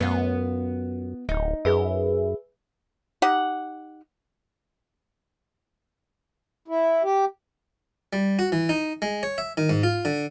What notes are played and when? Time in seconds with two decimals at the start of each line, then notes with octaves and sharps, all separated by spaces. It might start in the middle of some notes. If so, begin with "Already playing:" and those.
0.01 F#2 B3 F4
1.29 D1 D#4
1.65 F#2 G#4 B4 E5
3.22 D#4 G4 F#5
6.68 E4
7.03 G4
8.13 G3
8.39 F#4
8.52 E3
8.69 D#4
9.02 G#3
9.23 C#5
9.38 E5
9.57 D#3
9.69 G#2
9.83 F4
10.05 D3